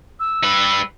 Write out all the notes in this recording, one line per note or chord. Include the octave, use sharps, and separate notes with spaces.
E6
G3 B4